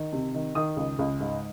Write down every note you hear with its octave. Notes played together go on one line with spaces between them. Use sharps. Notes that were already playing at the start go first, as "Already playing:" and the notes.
Already playing: D#3
C3
D#3
D#3 D#6
C#2
C#2
G#2